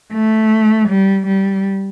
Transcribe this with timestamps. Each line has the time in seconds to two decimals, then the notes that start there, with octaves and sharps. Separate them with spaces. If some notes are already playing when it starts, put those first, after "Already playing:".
0.13 A3
0.89 G3
1.27 G3